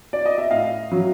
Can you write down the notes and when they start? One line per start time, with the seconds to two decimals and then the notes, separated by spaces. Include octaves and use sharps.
0.13 D5
0.26 D#5
0.38 E5
0.50 A2 D#5 F5
0.92 F#3